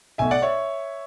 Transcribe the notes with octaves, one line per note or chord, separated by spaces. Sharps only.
B1 B2 A3 E5 G#5
D5 F#5
C#5 E5